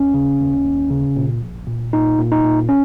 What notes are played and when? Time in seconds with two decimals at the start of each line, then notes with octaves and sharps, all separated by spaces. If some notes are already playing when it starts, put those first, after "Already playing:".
Already playing: D#2 C#4
0.14 C#3
0.40 D#2
0.65 D#2
0.90 C#3
1.17 A#2
1.42 A#1
1.67 A#2
1.93 A#2 D#4
2.19 A#2
2.32 D#4
2.44 A#2
2.69 C#4